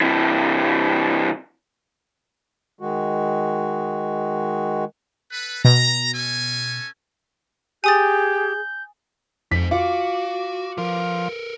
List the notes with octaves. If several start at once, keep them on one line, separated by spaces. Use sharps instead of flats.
C3 E3
D#3 G#3 F#4
A4 B4
B2 A#5
C#4 A4 G#5
G4 G#4 G#5 D#6 G6 A6
F2 D#4 C5 B6
F4 F#4 D6
F3 A#4 B4